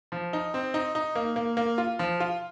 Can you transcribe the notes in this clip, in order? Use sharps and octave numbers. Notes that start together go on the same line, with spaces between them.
F3
D#4
C4
D#4
D#4
A#3
A#3
A#3
F4
F3
F4